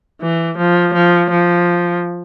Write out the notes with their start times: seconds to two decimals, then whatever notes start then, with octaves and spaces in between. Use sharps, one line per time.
0.21 E3
0.58 F3
0.94 F3
1.30 F3